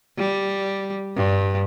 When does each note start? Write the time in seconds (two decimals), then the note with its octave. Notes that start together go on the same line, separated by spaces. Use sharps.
0.18 G3
1.17 G2